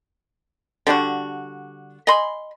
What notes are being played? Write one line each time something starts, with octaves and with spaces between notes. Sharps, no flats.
D3 G3 D4 F#4
D#5 G#5 B5 C6